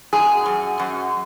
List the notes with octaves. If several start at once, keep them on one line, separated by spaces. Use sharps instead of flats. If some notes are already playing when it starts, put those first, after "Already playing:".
F#2 G#4
F#2
F#2